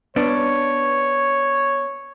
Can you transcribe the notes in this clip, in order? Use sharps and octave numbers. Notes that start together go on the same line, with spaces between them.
B3 D4 C#5